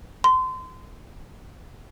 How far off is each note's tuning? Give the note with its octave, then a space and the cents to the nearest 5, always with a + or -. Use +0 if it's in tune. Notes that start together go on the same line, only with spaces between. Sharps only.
C6 -30